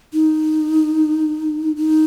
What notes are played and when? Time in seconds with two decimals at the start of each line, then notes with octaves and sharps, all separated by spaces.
0.14 D#4
1.76 D#4